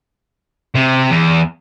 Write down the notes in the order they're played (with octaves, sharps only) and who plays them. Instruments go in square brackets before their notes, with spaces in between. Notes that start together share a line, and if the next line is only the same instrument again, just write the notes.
[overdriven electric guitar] C3
E2